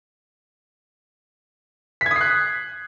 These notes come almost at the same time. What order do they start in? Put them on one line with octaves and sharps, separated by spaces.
B6 G#6 D#6 C7 F#6